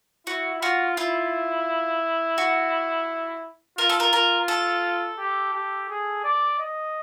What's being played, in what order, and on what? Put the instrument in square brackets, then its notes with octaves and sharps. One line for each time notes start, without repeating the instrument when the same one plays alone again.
[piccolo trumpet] E4 [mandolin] F#4
[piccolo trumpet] F4 [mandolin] F#4
[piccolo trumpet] E4 [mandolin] F4
[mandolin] F#4
[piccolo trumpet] F4 [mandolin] A#4
[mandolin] A4
A#4
[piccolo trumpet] F4 [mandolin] A#4
[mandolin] A4
[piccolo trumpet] G4
G4
G#4
D5
D#5